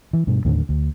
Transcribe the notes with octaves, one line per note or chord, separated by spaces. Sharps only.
E3
G2 B2
D#2 A2 D3
D2